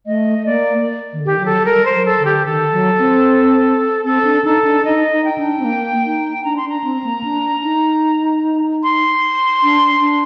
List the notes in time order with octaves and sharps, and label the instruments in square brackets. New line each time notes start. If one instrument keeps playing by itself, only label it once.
[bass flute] A3 [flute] D#5
[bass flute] A#3 [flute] D5
[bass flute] D#3
D3
[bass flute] D#3 [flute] G4
[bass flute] F#3
[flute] A4
[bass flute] G3 [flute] A#4
[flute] C5
[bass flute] F#3
[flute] A4
[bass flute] D3
[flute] G4
[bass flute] D#3 [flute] A4
[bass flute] F#3
C4
[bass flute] C4 [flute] A4
[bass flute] D4
[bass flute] D#4 [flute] A4
[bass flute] D4
[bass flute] D#4 [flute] D#5
[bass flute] D#4
[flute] G5
[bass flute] D4
C4
A#3
D#4
[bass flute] D4 [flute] A#5
[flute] C6
[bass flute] D4 [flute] A#5
[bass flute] C4
A#3
D4
D#4
[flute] C6
[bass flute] D4
D4